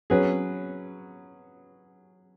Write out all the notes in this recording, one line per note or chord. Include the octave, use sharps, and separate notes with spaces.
F#3 C#4 G#4 B4